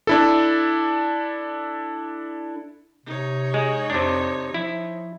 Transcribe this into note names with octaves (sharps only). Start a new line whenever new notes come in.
D4 E4 A4
C3 D#4 C#5
G#3
F2 C3 D4
F3 E4